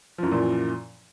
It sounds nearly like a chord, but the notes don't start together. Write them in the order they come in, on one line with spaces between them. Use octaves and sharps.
F3 F#2 E3 A#2